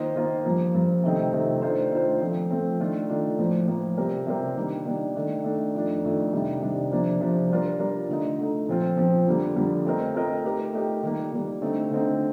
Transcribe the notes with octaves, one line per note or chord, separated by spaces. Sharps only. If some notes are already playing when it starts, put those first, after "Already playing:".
Already playing: D#3 A#3 F4 C5 D#5
D#3 A#3 F4 C5 D#5
G2 F3 A#3
G2 F3 A#3
C3 D#3 A3 C4 D#4
C3 D#3 A3 C4 D#4
D#3 A3 D4 F4 C5
D#3 A3 D4 F4 C5
F3 A3 C4
F3 A3 C4
D#3 A3 D4 F4
D#3 A3 D4 F4
A2 F3 A#3
A2 F3 A#3
C3 G3 C4 G4 A#4
C3 G3 C4 G4 A#4
D#3 G3 A#3 D4
D#3 G3 A#3 D4
D#3 A3 D4
D#3 A3 D4
F2 D#3 A3 D4
F2 D#3 A3 D4
C3 D#3 G3 D4
C3 D#3 G3 D4
C3 F3 A#3 D4
C3 F3 A#3 D4
G3 D4 F4 A#4
G3 D4 F4 A#4
D3 A3 D#4
D3 A3 D#4
A#2 F3 C4 F4
A#2 F3 C4 F4
F2 D3 G3 A#3
F2 D3 G3 A#3
A3 C4 F4 A#4 D#5
A3 C4 F4 A#4 D#5
A3 D#4 G4 A#4
A3 D#4 G4 A#4
D#3 G3 A#3
D#3 G3 A#3
D3 A3 C4 D#4
D3 A3 C4 D#4